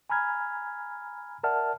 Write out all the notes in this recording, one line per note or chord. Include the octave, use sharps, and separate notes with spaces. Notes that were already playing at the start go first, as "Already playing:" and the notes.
G#5 A#5 B5 F6 G#6
A#4 D5 E5 F#5 A5 F6